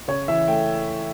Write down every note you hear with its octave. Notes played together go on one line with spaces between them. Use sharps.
C#3 C#5
E3 E5
A3 G5